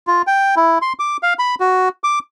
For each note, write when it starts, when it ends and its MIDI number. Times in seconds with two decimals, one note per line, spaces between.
0.07 0.22 65
0.27 0.55 79
0.56 0.78 64
0.82 0.93 84
0.99 1.17 86
1.23 1.34 77
1.39 1.55 83
1.60 1.89 66
2.04 2.19 86